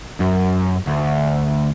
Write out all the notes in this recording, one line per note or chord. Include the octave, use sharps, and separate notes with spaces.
F#2
D2